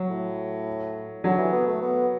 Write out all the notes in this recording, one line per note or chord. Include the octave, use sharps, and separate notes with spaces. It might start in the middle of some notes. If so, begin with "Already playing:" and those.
Already playing: F#3
A2
D3 F#3
E3
B3
A3
B3